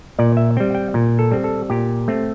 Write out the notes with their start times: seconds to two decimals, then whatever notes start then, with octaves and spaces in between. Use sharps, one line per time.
0.19 A#2 D5
0.37 E5
0.57 G3 C4 G5
0.75 G5
0.94 A#2
1.19 A4
1.31 G3 C4
1.44 A4
1.70 A#2 G4
2.08 A3 C4